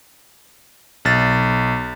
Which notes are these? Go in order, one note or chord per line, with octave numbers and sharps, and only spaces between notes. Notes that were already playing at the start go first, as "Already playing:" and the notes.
B1 A6